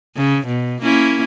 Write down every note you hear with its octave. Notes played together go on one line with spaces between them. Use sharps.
C#3
B2
A#3 C#4 E4